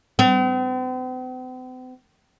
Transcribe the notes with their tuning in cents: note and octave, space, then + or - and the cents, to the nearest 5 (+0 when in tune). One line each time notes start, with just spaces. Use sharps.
C4 -45